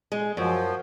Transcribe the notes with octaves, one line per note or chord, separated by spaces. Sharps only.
G#3
F#2 F3